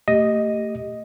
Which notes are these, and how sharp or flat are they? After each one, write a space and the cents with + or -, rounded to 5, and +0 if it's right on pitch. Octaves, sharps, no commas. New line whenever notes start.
A3 +30 G4 +0 D#5 +0